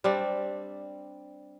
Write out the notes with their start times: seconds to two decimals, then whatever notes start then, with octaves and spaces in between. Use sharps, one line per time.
0.04 G3 C4 D4